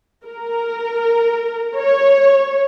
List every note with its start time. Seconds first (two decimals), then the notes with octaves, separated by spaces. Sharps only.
0.24 A#4
1.76 C#5